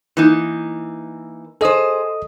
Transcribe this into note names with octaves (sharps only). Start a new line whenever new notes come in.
E3 A#3 D#4
G#4 A4 C5 D#5 D#6